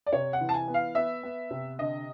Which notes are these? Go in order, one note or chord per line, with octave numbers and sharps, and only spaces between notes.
D5
C3 C#5
F#5
E3
A5
G#5
B3
F5
B3 E5
B3
C3
D3 D#5